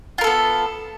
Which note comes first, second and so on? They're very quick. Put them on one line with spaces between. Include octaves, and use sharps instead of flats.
F4 A#4 A4 B3